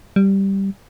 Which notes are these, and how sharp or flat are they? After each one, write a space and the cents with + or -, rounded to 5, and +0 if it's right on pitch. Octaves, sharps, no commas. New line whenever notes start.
G3 -5